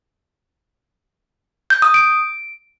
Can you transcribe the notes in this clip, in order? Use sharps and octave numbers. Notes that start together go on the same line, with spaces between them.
G6
D#6
D7